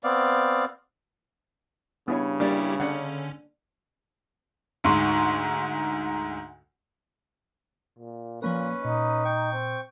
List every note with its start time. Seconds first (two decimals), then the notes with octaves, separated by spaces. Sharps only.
0.04 B3 C4 D5 F5
2.08 G2 C#3 B3 E4 C#5
2.40 G3 A#3 D4 E4 G4 D5
2.80 D3 C#4 D4 F#5
4.84 D2 G#2 C6 C#6
7.99 A#2
8.42 A#2 F3 A#3 C#4 A#4 B4
8.85 A#2 D#4
9.25 G5 C#6
9.53 C4